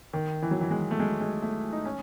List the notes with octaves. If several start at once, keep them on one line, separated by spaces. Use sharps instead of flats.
D#3
E3
F#3
E3
G#3
A3
G#3
G#3
A3
D#4
C#4